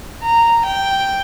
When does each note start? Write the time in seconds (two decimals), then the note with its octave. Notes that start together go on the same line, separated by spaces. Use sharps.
0.22 A#5
0.66 G5